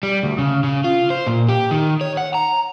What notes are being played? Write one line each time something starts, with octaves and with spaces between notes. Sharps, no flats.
G3
D2
C#3
C#3
F4
C5
A#2
G4
D#3
C#5
F#5
A#5